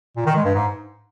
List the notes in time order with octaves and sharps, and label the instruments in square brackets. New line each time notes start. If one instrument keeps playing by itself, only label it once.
[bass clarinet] A#2
D#3
G#3
G2
G#2